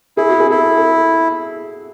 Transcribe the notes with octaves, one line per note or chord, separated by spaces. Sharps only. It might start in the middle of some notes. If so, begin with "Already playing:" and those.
E4 G#4
F#4
G#4
E4 A4
A4